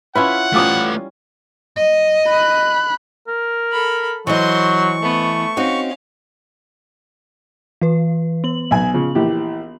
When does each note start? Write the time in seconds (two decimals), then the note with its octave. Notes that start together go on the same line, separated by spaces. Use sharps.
0.15 C#4 E4 F4 B4 F#5
0.54 G3 A3 C#4 F4 B4 D6 D#6
1.76 D#5
2.28 B5 F#6
3.28 A#4
3.72 A4 B5
4.27 E3 F#3 C5 D#5 C6 C#6
5.02 A3 B3
5.57 C4 C#4 D#4 F#4 F5
7.81 E3 B4
8.44 B3 F#7
8.71 B1 G#5
8.94 C#3 F3
9.15 A#1 E3 G4